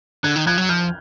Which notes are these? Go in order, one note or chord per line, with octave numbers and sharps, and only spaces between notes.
D3 F#6 G#6
D#3
F3 F#6 G#6
F#3
F3 F6 G6